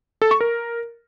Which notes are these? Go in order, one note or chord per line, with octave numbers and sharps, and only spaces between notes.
A4
C#6
A#4